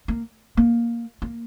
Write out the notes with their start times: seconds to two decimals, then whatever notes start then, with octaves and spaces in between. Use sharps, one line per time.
0.08 A#3
0.57 A#3
1.22 A#3